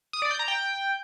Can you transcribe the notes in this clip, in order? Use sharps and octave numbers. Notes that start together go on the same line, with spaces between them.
D#6
D5
G6
A#5
G5